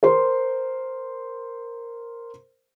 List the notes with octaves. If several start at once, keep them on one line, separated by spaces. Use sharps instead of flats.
A#4 C5 C6